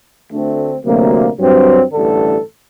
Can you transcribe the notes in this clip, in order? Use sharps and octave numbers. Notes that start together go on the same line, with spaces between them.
D2 D3 A3 C4
D2 C3 F#3 A#3
G2 F#3 C4
A1 G2 D3 A4